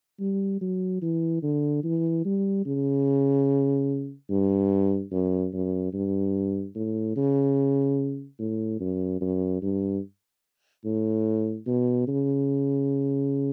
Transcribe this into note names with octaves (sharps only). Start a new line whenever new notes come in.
G3
F#3
E3
D3
E3
G3
C#3
G2
F#2
F#2
G2
A2
C#3
A2
F#2
F#2
G2
A2
B2
C#3